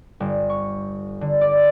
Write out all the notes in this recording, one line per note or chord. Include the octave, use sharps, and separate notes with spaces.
G1
C#6
D3
D5